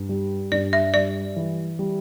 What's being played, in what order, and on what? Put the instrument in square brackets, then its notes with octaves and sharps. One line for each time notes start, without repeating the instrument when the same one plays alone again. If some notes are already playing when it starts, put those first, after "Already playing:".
Already playing: [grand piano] G2
G3
[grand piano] G2 [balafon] D5
[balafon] E5
[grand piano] G3 [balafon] D5
[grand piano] E3
G3